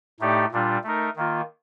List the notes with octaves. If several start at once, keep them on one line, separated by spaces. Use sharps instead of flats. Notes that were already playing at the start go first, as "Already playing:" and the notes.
A2 A3 D#4 G4 D5
A#2 G3 D4 F4
A3 D#4 A#4
D#3 A#3 F4